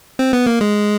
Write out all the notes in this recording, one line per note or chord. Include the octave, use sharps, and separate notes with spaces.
C4
B3
A#3
G#3